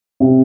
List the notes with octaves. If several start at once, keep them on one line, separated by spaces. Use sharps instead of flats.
C3